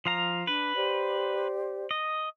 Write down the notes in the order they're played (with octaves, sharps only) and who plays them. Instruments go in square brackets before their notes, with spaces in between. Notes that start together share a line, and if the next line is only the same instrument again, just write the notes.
[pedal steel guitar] F3 F5 A#5
[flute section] D4 [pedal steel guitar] B4
[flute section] G4 C5 D5
[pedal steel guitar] D#5